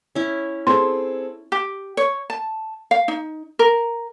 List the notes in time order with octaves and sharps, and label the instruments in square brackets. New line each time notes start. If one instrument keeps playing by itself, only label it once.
[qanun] C#4 E4
[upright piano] C4 G#4 A4 [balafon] C6
[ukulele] G4
C#5
A5
F5
D#4
A#4